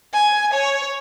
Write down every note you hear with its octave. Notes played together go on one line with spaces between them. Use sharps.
G#5
C#5